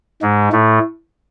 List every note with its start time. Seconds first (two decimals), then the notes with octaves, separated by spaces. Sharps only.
0.22 G#2 G#3
0.52 A2 A3